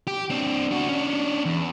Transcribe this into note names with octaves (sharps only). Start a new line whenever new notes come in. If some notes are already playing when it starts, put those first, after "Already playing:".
G4
C4 D4
D4 F#4
C#4 D4
E2